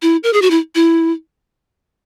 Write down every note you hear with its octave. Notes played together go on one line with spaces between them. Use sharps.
E4
A#4
G#4
F#4
E4
E4